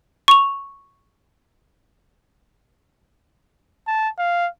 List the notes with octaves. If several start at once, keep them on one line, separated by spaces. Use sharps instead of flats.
C#6 F7
A5
F5